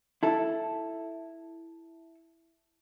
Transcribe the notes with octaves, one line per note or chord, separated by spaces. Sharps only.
E4 A4